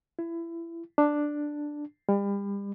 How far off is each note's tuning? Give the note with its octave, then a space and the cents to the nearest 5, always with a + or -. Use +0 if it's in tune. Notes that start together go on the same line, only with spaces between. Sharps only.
E4 +25
D4 +5
G3 +35